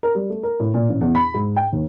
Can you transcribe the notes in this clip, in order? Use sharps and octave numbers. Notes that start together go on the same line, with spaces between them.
A#4
G3
A3
A#4
A2
A#2
A1
E2
B5
G#2
G5
D#2